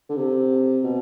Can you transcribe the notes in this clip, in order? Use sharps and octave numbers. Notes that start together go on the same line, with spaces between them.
D3
C3
B2